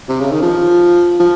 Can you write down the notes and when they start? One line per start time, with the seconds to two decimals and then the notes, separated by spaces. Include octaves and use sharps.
0.09 C3
0.20 C#3
0.31 D#3
0.42 F3
1.20 F3